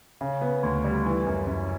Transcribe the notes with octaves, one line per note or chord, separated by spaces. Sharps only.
C#3
B3
D2
G3
E3
F#2
F#2